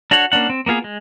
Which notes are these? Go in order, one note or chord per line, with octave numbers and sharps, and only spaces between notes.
D4 F#4 A4 C#5 F#5
A#3 C#4 D4 F#5
C4
A#3 B3 F4 G#4
G#3